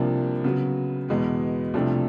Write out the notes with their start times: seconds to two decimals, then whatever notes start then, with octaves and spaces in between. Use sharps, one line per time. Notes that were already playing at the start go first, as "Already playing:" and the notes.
Already playing: C2 C3 F3 A#3 D4
0.44 C#3 F#3 B3
1.09 E2 B2 G#3 B3
1.74 C2 C3 F3 A3 D4